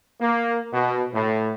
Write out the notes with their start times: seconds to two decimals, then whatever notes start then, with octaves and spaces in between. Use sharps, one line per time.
0.21 A#3
0.73 B2
1.14 A2